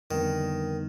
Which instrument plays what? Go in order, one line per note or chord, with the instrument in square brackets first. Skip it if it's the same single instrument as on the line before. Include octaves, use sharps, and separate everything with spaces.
[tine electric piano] F2 D3 G3 B3 D#4 [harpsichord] D#3